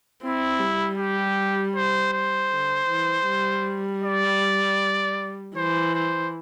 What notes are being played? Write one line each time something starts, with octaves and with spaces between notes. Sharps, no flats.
C4 E4
G3
G4
C5
C5
D3
E3
G3
D5
E3 C5
C5